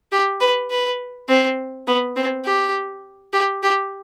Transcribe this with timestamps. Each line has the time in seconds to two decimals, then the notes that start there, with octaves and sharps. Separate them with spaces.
0.12 G4
0.41 B4
0.71 B4
1.29 C4
1.87 B3
2.16 C4
2.45 G4
3.33 G4
3.63 G4